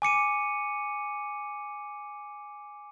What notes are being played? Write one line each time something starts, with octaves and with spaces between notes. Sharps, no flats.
G#5 D6 C#7 D#7